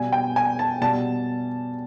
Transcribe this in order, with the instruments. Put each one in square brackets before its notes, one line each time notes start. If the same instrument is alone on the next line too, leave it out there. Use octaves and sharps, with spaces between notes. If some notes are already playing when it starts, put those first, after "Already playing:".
Already playing: [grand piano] B2 G3 G#5
G5
G#5
A5
B2 G3 A5